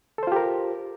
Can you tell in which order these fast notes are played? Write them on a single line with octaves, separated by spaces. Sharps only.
A4 C5 F4 G4 A#4